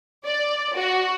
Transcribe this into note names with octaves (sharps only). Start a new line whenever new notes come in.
D5
F#4